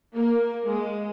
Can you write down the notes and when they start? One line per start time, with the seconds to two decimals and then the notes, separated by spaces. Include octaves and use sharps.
0.15 A#3
0.66 G#3